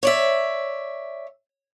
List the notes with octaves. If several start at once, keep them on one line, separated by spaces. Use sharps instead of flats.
C#5 D5 E5